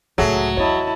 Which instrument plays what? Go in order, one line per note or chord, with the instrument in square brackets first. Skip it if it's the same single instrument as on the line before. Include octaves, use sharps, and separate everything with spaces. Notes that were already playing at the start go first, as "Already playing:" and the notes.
[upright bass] C#2 A2 [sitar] F#3 [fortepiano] G#4 A4 E5
[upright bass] E2 [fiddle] E4 A5 [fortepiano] C#5 D#5